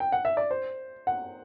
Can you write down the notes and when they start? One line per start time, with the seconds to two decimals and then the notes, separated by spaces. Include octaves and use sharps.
0.00 G5
0.12 F#5
0.25 E5
0.37 D5
0.51 C5
1.07 F#5